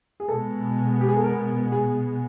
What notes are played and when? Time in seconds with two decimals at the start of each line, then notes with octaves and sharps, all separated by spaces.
0.20 G#4
0.28 B2 G#3 B3 A4
1.00 G4
1.08 G#4
1.16 A4
1.24 A#4
1.72 G#4